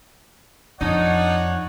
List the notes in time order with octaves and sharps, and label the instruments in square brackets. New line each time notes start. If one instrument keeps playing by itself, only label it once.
[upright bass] F2 [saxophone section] D4 D#4 [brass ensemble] C#5 D5 F#5